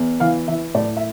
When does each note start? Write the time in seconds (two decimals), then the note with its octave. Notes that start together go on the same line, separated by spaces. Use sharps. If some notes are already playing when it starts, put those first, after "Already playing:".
Already playing: E2
0.20 E3 F5
0.48 E3 E5
0.75 A2 D5
0.97 E5